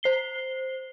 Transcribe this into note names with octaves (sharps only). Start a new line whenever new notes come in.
C5 C7 G7